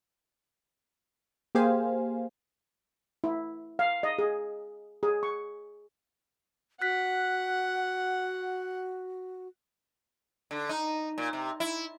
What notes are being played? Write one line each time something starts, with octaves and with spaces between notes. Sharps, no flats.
A#3 G4 G#4 C5 F5 G#5
E4
F5
D#5
G#4
G#4
C#6
F#4 F#5 F#6 B6
D3
D#4
A#2
C3
E4